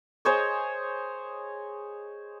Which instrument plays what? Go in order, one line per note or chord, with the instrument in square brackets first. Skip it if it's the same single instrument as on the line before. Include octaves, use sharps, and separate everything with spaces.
[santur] G#4 C5 C#5 D#5